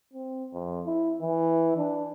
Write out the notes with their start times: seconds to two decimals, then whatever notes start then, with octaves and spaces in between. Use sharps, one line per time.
0.13 C4
0.53 F2
0.86 E4
1.21 E3
1.77 D4